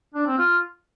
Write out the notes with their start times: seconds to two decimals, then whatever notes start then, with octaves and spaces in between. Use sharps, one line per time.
0.14 D4
0.26 C4
0.38 F4